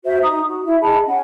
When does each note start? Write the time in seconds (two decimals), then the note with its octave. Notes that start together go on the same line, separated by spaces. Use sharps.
0.05 F#4 C5 E5
0.22 D#4 A#5 D#6
0.47 F#4
0.66 E4 E5
0.81 G#4 D#5 A5 B5
1.06 C#4 F#5